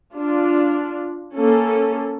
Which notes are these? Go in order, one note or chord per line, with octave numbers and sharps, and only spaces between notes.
D4 F4
A#3 C#4 A4